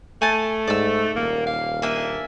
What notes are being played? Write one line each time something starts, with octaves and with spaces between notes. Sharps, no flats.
A3 G#5 A5
G#2 D5 E6
D#1 A#3
F5
A#3 D4 E5 G#5